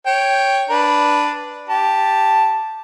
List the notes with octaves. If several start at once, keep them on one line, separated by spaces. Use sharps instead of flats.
C#5 G5
D4 B4
G4 A5